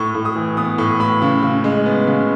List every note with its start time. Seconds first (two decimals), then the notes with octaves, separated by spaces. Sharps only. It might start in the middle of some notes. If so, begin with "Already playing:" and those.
Already playing: A2 C#6
0.15 A2
0.25 D#6
0.36 E3
0.57 B3 D#6
0.78 A2 C#6
1.00 A2 B5
1.22 C#3
1.43 C#3
1.64 G#3
1.86 B3
2.07 C#3